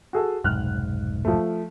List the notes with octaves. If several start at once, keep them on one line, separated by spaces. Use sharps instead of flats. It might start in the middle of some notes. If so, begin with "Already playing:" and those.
F#4 G#4 A4
F1 B1 G#2 F6 F#6
F3 A3